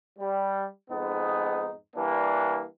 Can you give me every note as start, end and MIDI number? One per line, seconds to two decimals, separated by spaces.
0.19 0.66 55
0.90 1.73 41
0.90 1.73 44
0.90 1.73 59
0.90 1.73 63
1.95 2.65 52
1.95 2.65 55
1.95 2.65 58
1.95 2.65 62